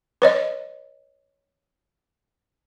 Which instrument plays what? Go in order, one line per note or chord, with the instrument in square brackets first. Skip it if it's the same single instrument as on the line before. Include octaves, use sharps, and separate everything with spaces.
[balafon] B4 C#5 D#5